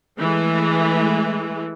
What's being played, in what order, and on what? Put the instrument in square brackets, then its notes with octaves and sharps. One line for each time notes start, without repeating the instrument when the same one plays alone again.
[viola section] E3 G#3 A3